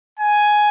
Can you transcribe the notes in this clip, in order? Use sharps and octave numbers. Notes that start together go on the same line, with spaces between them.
G#5